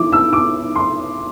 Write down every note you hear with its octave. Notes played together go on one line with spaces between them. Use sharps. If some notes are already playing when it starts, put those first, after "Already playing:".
Already playing: E3 E4 D6
E6
D6
C6